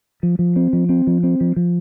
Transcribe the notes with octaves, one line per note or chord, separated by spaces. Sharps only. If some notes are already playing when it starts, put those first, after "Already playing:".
F3
F3
C4
F3
C4
F3
C4
F3
F3